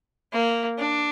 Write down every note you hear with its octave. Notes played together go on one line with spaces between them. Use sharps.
A#3
D4